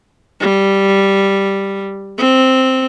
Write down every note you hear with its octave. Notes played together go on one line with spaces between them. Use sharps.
G3
C4